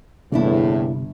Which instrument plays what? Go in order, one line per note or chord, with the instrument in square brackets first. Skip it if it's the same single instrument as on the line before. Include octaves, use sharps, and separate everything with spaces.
[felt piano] G1 [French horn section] E2 A2 [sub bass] C3 [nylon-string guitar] A#3 D4 E4